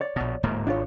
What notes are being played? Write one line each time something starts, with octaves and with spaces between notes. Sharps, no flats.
C#5 D5
A#1 B2
D1 G#2 A#3
G#1 D4 F4 C#5